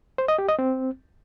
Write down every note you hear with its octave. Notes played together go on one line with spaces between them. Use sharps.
C5
D#5
G4
D#5
C4